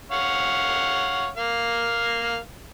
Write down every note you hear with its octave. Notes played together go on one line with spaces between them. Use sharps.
C#5 F5 F#5
A#3 F5